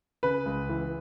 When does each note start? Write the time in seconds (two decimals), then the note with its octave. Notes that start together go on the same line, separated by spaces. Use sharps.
0.23 C#3 B4
0.46 C#2
0.69 E3